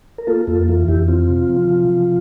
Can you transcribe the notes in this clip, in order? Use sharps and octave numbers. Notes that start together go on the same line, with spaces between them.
A#4
A#3 F4 A4
F2 F4 A4
E3 F4
F2 E4 G4
C4 F4
C3
F3
C3
F3